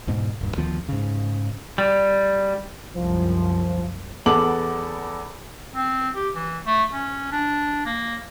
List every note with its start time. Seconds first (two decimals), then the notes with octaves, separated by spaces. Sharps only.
0.07 E2 G#2 B2
0.41 D#1 G2
0.57 D2 D#3 F3 B3
0.88 G#2 C#3
1.78 G3
2.96 C2 F#2 F3
4.26 E2 B3 A4 D6 F#7
5.75 C4
6.15 G4
6.35 E3
6.66 A3
6.93 C#4
7.32 D4
7.86 A#3